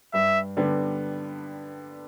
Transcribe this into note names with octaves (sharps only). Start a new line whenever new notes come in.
G2 E5
D3 G3 B3